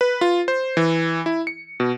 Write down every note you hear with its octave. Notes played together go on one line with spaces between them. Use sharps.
B4
F4
C5
E3
E4
C#7
B2